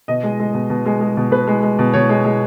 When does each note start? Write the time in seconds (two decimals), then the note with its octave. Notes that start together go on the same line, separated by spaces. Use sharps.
0.08 B2 D#5
0.23 G#3
0.40 G#3
0.54 B2
0.70 B2
0.86 G#3
1.01 G#3
1.17 B2
1.31 B2 B4
1.47 G#3
1.63 G#3
1.79 B2
1.93 B2 C#5
2.09 G#3
2.25 G#3